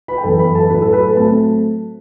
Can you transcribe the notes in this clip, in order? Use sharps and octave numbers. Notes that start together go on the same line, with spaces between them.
B4 B5
G5
F#2 E3 B3 A4 A5
B4 B5
A4 A5
A2 F#3 A3 B4 B5
A4 A5
B4 B5
A4 A5
F#3 A3 C4 A5